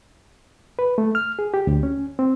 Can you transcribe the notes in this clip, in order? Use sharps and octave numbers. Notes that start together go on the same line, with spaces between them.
B4
A3
F6
G#4
G4
D2
C#4
C4